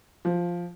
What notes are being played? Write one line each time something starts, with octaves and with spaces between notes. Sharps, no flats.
F3